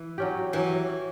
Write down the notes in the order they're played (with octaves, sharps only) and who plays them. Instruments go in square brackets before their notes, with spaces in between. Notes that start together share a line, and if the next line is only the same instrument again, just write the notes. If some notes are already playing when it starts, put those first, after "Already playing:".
Already playing: [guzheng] E3
[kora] F#3 C#4 G4
[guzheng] E3 [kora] F#3 C#4 G4